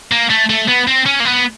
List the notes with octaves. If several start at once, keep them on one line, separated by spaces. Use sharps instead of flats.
A#3
A3
A3
B3
C4
C#4
A#3
B3